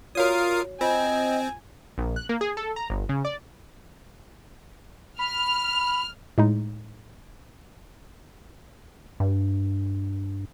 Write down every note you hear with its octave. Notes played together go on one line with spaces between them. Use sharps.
F4 F#4 A#4 C#5 D5 F5 D#6
C4 F4 D#5 G#5
A#1
F#6
A#3
G#4
A4
A#5
G1
C#3
D5
B5 F6
A2 G#3 D#4
G2